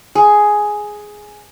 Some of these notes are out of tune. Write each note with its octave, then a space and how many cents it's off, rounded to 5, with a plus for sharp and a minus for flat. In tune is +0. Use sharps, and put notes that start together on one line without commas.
G#4 +5